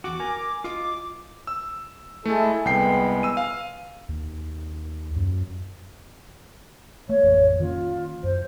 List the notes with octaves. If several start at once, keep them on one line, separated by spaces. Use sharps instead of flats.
E2 F#4 D6
A#4 G#5
F4 D#5 D6
E6
G#3 A3 E4 A4
C2 G#3 B3 G5 C7
E6 D#7
F5
D#2
F#2
A3 A#3 C#5
A1 F2
D#3 A#3 C#4 F4
F#2 C5